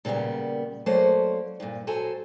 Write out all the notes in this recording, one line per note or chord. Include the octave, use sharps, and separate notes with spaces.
A#2 C#3 G3 A#3 B3
F#3 A3 A#3 C#4 C5 D5
G2 A#2
F#3 F#4 A4 C5 G#5 A#5